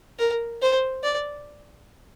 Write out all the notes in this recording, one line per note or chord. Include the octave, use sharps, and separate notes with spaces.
A#4
C5
D5